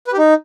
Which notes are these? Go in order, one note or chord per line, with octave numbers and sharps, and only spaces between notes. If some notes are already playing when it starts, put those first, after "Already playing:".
B4
G4
D#4